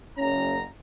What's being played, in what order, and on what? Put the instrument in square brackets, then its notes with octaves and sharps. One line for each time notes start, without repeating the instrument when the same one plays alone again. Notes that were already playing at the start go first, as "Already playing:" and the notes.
[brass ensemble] F#1 A#5 [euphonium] C#4